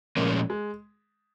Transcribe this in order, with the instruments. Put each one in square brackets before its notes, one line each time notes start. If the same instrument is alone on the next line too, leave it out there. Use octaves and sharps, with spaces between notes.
[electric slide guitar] A#2 F3 G#3 C#4 [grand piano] A#3
[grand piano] G#3